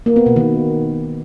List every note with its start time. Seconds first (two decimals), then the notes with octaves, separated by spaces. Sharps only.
0.06 A#3
0.16 B3
0.26 B2
0.36 D#3